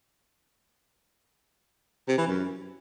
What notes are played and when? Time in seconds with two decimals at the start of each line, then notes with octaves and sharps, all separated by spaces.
2.08 C3
2.18 E3
2.27 F#2